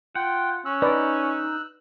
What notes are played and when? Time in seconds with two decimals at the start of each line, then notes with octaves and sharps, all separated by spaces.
0.15 F4 F#5 G5
0.65 C#4 E6 F#6
0.82 D#4 B4 D5